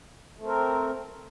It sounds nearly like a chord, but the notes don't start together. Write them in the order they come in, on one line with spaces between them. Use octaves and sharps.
A3 C4 A#4